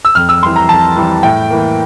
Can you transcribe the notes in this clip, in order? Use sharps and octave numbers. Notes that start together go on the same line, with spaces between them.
E6
F2 F6
E6
E3 G3 C6
A#5
F2 A5
E3 G3
A2 G5
E3 A#3